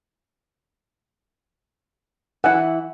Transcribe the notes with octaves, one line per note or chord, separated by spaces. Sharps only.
E3 E4 F#5